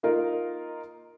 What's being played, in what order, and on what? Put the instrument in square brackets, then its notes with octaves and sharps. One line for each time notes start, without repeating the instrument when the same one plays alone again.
[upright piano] A#3 D#4 F4 A#4